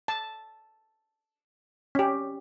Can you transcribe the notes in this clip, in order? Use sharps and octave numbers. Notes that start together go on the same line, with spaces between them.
A5
C#4 G4